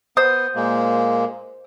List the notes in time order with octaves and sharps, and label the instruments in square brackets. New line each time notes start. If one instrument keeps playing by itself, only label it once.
[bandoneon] B3 [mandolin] C5 D#6
[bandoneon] A#2 G#3 A#3